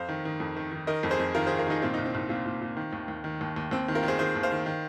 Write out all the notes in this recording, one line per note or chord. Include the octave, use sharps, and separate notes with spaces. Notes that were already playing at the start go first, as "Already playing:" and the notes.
Already playing: F2 C5 F5
D#3
D#3
F2
D#3
D#3
D#3 A#4 D#5
F2
G#4 C5
F2
D#3 F4 A#4
D#3 G#4 C5
F4 A#4
D#3 D#4 G#4
A#2 C4 F4
C2 D#4
C4
C2 D#4
A#2 C4 F4
A#2
A#2
D#3
D#2
D#2
D#3
D#2
D#2
D#2 C4
D#3
F4 A#4
D#3
G#4 C5
D#3 G#4 C5
D#2
C5 F5
D#3
D#3